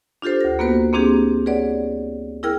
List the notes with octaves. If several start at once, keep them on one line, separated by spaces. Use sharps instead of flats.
D4 F4 G4 A4 C5
D2 A#6
A#3 B3 F#4 B4 C5
A#3 C4 D4 G4 G#4
G#4 B4 C#5 D5 F#5
E4 G#4 A#4 G5 F6